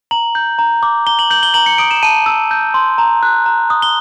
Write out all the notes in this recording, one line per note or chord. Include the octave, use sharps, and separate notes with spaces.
A#5 F#7
G6
A#5
D6
A#5 G7
F#7
G6 F#7
G7
A#5 F#7
C#7
D#6 D7
E7
A5 D#7
E6
G6
C6
A#5
F#6
A#5
D#6
G7